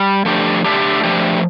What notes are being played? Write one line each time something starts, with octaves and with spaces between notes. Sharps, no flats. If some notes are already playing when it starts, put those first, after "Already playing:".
Already playing: G3
F3 A3 D4 G4
D3 A3 D4 G4
F3 A3 D4 G4